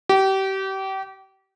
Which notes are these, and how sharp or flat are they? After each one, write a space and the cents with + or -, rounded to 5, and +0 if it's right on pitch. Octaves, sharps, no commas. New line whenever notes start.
G4 -30